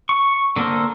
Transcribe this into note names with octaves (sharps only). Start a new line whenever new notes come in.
C#6
D3 A#3 A4 A#4 C5